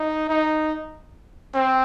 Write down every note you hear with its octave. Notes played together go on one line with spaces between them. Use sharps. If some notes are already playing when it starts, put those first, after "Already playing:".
Already playing: D#4
D#4
C4